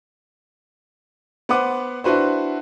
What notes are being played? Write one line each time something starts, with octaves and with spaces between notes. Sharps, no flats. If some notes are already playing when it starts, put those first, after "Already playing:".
B3 B4 C5 F#5 D6
D4 E4 F#4 B4 C5